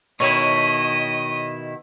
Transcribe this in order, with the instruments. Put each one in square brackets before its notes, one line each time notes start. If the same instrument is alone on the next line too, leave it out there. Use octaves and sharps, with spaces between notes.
[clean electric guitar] B2 D#3 E4 [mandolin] C#5 [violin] D#5 D#7